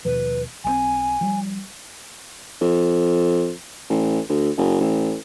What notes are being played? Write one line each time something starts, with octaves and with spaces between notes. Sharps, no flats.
D#2 B2 F3 B4
B1 D#3 C4 G#5
F3 G3
F2
A1
D2
F#1
A1